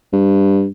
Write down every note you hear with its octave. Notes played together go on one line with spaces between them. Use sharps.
G2